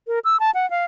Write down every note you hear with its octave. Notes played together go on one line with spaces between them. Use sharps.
A#4
E6
A5
F#5
F5